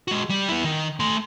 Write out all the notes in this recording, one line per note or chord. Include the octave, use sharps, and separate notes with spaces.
G#3 F#4
G3
B3 E4
D#3
A3 C6